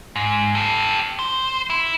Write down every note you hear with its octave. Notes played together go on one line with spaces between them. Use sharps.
G#2
G4 A4
C5
E4